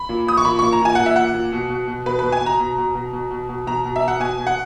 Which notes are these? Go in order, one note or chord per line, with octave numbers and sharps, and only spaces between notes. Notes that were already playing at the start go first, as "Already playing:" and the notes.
Already playing: B5
A#2
A#2 D#6
C#6
A#2 B5
A#2 C#6
A#5
A#2 G#5
A#2 F#5
E5
A#2 F#5
A#2
B2
B2
B2
B2 B4
B2 B4
G#5
B2
A#5
B2
B2
B2
B2
B2
B2
B2 A#5
B2
E5
B2
F#5
B2 G#5
B2
F#5